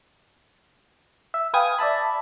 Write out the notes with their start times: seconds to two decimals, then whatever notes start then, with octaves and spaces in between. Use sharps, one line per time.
1.34 E5
1.54 B4 F5 G5 G#5 D#6 G#6
1.78 D5 E5 A5 B5